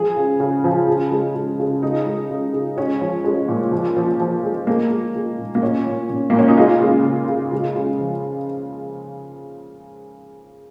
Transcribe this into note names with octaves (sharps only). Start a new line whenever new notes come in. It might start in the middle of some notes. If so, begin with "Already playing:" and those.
Already playing: F3 G#3 G#4
C#3
C#3
F3
C#3
G#3
C#3
C#3
G#3 D#4
G#3
C#3
G#3
G#3 C#4
F3
G#3
A#2
F3
F3
F3
G#3
G#3 A#3
G#3
G#3
A#2
A#3
A#2 C#4
A#2
A#2
A#2 A#3
C#4
D#4
G#3 F4
C#3
C#3
C#3
G#3
C#3
F3